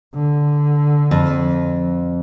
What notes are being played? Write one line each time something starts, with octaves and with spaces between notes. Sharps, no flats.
D3
F2